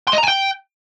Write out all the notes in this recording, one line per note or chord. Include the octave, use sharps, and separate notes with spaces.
C6
D#5
A#5
G#5
G5